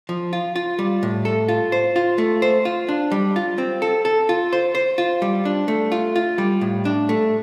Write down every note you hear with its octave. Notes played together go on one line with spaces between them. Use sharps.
F3
F4
F4
G3
A2
A4
F4
C5
F4
A3
C5
F4
D4
G3
F4
C4
A4
A4
F4
C5
C5
F4
G3
D4
A3
F4
F4
G3
A2
D4
A3